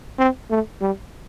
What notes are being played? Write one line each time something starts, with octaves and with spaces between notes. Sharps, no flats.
C4
A3
G3